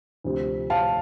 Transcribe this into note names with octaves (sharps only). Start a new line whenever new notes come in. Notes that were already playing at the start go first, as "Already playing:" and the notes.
D2 C3 F3 C4
F5 A5